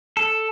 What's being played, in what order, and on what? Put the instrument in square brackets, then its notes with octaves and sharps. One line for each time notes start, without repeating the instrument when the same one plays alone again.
[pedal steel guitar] A4